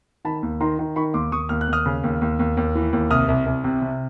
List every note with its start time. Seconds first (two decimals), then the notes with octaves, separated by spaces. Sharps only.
0.25 D#3 A5 B5
0.43 D#2
0.60 D#3 A#5 C6
0.79 D#3
0.96 D#3 B5 C#6
1.14 D#2 C6 D6
1.32 D#2 C#6 D#6
1.49 D#2 F6
1.61 F#6
1.68 D#2 D#6 F6
1.86 C#3
2.04 D#2
2.22 D#2
2.39 D#2
2.57 D#2
2.75 E3
2.93 D#2
3.10 C2 D#6 F6
3.28 C2
3.46 C2
3.64 C3
3.82 C3